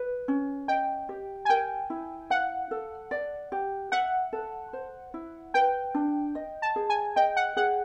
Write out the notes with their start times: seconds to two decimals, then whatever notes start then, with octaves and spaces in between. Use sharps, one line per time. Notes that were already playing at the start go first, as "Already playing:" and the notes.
Already playing: B4
0.28 C#4
0.68 D#5 G5
1.09 G4
1.45 G#5
1.49 A#4 G5
1.90 E4
2.30 F5 F#5
2.71 A4
3.11 D5
3.52 G4
3.92 E5 F#5
4.33 A4
4.73 C5
5.14 E4
5.54 B4 G5
5.95 D4
6.35 D#5
6.62 A5
6.76 G#4
6.90 G#5
7.16 D#5 G5
7.36 F#5
7.57 G#4 F#5